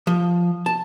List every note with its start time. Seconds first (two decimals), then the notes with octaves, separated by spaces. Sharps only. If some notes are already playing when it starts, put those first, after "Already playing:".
0.07 F3
0.66 A5